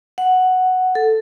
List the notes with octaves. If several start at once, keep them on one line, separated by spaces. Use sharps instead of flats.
F#5
A4